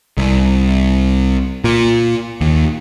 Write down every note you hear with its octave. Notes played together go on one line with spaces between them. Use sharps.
C2
A#2
D#2